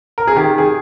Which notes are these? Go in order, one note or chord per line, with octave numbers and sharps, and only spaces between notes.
A#4
G#4
D#3 G4
G#4